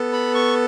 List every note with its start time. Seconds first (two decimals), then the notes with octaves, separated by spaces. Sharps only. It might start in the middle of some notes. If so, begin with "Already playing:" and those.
Already playing: B3 A4
0.13 B5
0.35 C#6